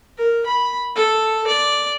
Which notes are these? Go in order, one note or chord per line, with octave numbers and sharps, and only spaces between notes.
A#4
B5
A4
D5